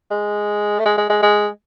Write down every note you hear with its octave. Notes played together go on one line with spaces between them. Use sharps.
G#3
A3
G#3
G#3
G#3
G#3